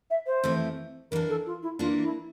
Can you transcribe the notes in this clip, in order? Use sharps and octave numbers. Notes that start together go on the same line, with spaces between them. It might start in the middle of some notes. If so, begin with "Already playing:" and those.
E5
C5
F2 E3 A3 E4 G4
E3 A#3 D4 A#4
A4
F4
E4
E3 A#3 D4 F4
E4